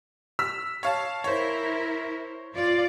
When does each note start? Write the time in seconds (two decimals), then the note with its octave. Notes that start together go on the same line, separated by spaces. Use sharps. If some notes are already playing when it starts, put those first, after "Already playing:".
0.39 E6 F6 B6
0.83 C#5 F5 A5
1.24 E4 A#4 C5 C#5
2.54 F4 D5